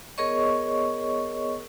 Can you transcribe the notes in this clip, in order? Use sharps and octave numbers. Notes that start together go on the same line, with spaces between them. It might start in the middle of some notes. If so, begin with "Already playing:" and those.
B3 G#4 A#4 C#5 D#5 C#6